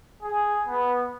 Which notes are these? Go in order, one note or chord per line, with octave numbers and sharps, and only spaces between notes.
G#4
B3